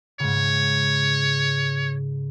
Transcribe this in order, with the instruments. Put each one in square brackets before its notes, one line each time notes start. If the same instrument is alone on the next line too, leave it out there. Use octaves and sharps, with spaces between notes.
[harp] G#2 C#3 [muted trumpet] C#5